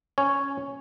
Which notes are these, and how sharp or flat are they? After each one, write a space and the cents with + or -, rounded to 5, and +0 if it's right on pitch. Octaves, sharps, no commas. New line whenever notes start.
C#4 +0 C#5 +0